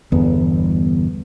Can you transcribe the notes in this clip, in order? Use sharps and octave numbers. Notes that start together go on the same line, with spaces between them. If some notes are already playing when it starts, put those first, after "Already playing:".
G1 E2 B3